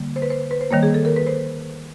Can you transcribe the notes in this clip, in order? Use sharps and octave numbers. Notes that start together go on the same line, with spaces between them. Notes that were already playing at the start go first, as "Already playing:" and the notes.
Already playing: D3 G3 A#3
C5
B4
C5
B4
C5
D#3 G3 A#3 C#5
G#4
A4
A#4
B4
C5